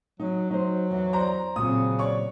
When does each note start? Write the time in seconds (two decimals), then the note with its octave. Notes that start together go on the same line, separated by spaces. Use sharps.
0.20 F#3 D#4
0.51 F#3 D#4 C5
0.91 E2
1.13 C5 D5 A#5
1.56 A#2 C#3 F#3 C4 D#6
1.99 C#5 D5 C#6